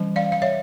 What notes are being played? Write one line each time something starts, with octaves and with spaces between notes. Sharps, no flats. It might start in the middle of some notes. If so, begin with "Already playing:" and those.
Already playing: E3 G3 C#4
D5 F5
F5
C#5 E5